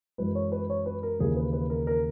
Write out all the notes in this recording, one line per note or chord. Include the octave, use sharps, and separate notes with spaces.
F#2 E3 G#3 B4
C#5
B4
C#5
B4
A#4
D#2 C#3 E3 A#3 G#4
B4
B4
A#4
A#4